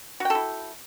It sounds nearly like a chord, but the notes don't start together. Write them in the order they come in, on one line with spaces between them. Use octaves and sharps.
F#4 G5 A4 E4